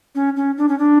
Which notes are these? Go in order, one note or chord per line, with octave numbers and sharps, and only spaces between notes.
C#4
C#4
D4
C#4
D4